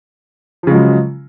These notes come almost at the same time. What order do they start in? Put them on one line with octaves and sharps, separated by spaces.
F3 C#3 G#3 F#3